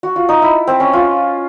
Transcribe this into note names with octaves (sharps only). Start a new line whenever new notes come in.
F#4
F4
D#4
E4
C4
C#4
F4